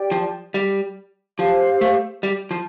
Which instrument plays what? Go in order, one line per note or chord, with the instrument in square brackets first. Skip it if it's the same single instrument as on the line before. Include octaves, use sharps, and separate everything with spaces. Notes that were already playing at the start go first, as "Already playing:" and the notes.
Already playing: [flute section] G4 D5 G5
[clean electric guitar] F3
G3
[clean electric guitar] F3 [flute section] G4 C5 F5
[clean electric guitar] A3
G3
F3